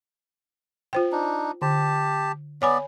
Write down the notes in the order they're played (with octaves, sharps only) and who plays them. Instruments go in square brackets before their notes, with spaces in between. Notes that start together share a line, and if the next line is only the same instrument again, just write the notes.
[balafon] F4 C5 G5
[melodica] D4 D#4
[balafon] D3 [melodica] G4 A5
[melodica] B3 D5 [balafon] C#5 G#5 B5